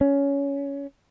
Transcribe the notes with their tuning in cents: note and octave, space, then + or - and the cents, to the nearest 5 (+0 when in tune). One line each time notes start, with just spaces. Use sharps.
C#4 +15